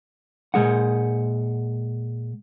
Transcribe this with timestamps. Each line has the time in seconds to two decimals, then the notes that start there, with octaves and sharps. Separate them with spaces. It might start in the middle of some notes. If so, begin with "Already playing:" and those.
0.54 A#2 G#3 G#4 F#5